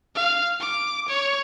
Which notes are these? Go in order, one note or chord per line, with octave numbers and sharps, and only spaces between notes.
F5
D6
C#5